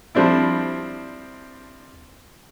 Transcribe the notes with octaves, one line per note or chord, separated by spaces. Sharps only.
F3 G3 C4 D4 E4